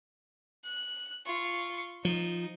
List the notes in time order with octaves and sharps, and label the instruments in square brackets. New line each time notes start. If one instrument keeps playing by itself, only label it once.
[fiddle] F#6
F4 C#6
[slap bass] F3 [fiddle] D#4